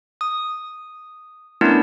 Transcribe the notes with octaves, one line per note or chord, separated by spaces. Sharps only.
D#6
A3 B3 C#4 D4 E4 A#4